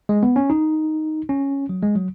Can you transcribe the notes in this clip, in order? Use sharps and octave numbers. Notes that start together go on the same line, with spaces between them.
G#3
B3
C#4
D#4
C#4
F#3
G#3
F#3